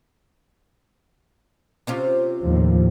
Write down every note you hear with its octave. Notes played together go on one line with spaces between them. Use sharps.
C3 C#4 F4
D#2 A2 F3